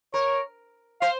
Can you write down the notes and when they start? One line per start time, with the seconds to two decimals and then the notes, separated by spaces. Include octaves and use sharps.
0.14 A#4 C#5
1.01 C5 F5